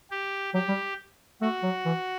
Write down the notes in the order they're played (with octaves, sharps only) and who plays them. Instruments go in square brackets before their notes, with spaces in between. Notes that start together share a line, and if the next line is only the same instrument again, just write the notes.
[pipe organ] G4
[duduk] F#3 [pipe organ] G4
[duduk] G3
[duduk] A3 [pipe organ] F#4
[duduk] F#3
E3